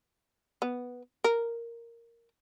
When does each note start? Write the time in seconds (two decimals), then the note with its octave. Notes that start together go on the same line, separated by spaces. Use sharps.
0.62 B3
1.24 A#4